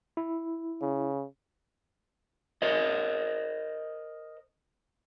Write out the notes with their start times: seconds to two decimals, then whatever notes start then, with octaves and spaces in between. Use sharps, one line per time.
0.17 E4
0.81 C#3
2.62 A#4 C5 D#5